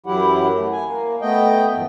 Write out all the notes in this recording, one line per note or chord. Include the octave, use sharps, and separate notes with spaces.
F#2 E3 F#3 E4 G4 F#5
A3
G#5
A#3
A3 B3 D#5 G5
F#2 A2 E3